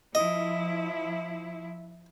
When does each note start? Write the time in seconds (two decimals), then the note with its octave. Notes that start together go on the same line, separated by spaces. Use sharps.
0.15 F3 E4 D#5